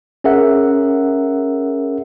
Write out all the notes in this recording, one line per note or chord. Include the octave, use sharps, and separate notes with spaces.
C#4 G#4 A#4 E5 F#5